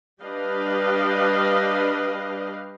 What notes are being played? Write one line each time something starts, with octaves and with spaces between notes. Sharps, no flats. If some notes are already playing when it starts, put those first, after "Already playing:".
G3 D4 G4 B4 D#5 F5